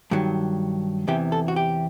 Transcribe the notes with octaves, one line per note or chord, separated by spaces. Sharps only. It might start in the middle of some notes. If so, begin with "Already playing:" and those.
G2 D#3 F#3
E2 C3 E3 G4
A4
F#4
G4